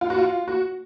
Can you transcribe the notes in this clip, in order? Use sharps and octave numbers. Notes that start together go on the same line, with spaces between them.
F4
F#4
F4
F#4